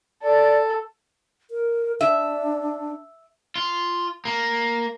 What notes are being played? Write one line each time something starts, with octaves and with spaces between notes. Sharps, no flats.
A4 D5
A#4
D4 E5
F4
A#3